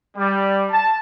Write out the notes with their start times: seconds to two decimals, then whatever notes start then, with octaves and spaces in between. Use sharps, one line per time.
0.17 G3
0.71 A5